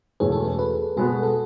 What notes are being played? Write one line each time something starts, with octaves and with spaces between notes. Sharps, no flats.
E1 E2 B2 A3 C#4 G#4
A4
A4
B4
B2 G#3 B3 F#4 A4
A4